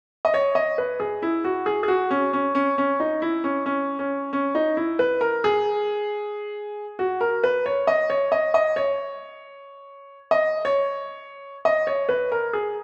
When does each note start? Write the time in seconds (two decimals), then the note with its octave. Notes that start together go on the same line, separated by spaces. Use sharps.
0.25 D#5
0.34 C#5
0.55 D#5
0.78 B4
1.00 G#4
1.22 E4
1.44 F#4
1.66 G#4
1.83 G#4
1.88 F#4
2.11 C#4
2.33 C#4
2.55 C#4
2.78 C#4
3.00 D#4
3.22 E4
3.44 C#4
3.66 C#4
3.99 C#4
4.33 C#4
4.55 D#4
4.77 E4
4.99 B4
5.21 A#4
5.44 G#4
6.99 F#4
7.21 A#4
7.44 B4
7.66 C#5
7.87 D#5
8.10 C#5
8.32 D#5
8.54 D#5
8.76 C#5
10.31 D#5
10.65 C#5
11.65 D#5
11.87 C#5
12.09 B4
12.32 A#4
12.53 G#4